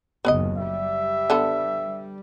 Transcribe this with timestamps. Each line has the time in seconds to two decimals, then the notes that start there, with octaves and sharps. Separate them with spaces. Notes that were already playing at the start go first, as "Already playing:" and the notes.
0.25 F#1 D#2 B3 D5 D#5
0.57 G3 E5
1.30 D3 B3 A4